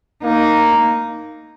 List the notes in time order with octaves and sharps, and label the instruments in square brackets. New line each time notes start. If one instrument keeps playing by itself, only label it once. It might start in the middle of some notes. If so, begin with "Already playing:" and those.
[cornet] A#3 [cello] D#4